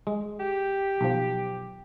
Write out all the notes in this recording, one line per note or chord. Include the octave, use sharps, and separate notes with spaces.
G#3
G4
B1 F3